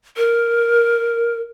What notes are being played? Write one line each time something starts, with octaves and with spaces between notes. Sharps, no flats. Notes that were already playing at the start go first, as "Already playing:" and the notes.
A#4